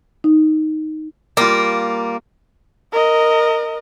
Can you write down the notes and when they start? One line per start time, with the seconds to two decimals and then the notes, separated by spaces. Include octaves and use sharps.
0.24 D#4
1.37 G3 A#3 F4
2.92 A#4 D#5